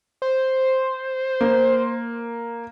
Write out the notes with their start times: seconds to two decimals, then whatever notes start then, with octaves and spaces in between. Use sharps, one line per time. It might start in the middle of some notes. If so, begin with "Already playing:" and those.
0.22 C5
1.41 A#3